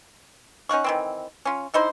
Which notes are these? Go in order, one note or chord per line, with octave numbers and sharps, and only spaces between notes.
C#4 D#4 F#5 C#6
D#3 E3 C4
C#4 F4
D3 D#4 E4 C5